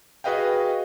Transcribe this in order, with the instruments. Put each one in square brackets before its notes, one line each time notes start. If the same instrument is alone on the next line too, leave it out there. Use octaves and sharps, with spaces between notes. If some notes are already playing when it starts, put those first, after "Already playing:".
[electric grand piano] F#4 G#4 B4 D#5 F5 G5